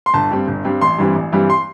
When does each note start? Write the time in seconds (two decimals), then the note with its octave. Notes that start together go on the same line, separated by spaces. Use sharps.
0.06 C6
0.14 G1 A5
0.31 G2 G3 C4
0.48 G1
0.65 G2 G3 C4
0.81 A1 C6
0.99 G2 E3 G3 C4
1.16 A1
1.33 G2 E3 G3 C4
1.50 C6